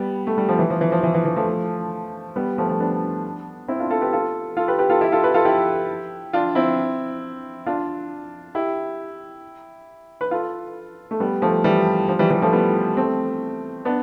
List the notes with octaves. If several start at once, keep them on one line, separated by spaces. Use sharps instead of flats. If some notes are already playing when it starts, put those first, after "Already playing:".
Already playing: G3 B3
A3
G3
F3
E3
F3
E3
F3
E3
E3
E3
F3 A3
G3 B3
F3 A3
F3 A3
B3 D4
C4 E4
D4 F4
F4 A4
G4 B4
F4 A4
F4 A4
G4 B4
G4 B4
F4 A4
E4 G4
F4 A4
G4 B4
F4 A4
E4 G4
D4 F4
C4 E4
D4 F4
E4 G4
B4
F4 A4
A3
G3 B3
F3 A3
E3 G3
F3
E3 G3
E3 G3
F3 A3
G3 B3
A3 C4
B3 D4